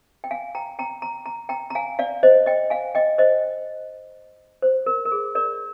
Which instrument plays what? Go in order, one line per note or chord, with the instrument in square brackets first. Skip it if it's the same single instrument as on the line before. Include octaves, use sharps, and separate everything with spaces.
[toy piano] G5
F5 G#5
G5 A#5
G5 A#5
A#5
A#5
G5 A#5
A#5
F5 G#5
D5 F5
C5 D#5
D#5 G5
F5 G#5
D#5 G5
C5 D#5
C5
A#4
A#4
G#4
A#4 D5